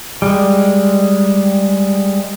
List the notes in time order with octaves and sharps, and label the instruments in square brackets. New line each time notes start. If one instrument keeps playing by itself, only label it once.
[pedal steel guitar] G3 G#3